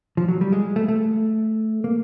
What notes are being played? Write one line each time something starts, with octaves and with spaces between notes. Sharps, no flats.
F3
F#3
G3
G#3
A3
A3
A#3